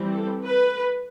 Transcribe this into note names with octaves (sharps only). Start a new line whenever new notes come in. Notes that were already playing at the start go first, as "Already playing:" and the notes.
Already playing: E3 G3 C4
A4
B4